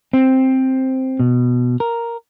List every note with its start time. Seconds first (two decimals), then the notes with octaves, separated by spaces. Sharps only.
0.13 C4
1.20 B2
1.80 A#4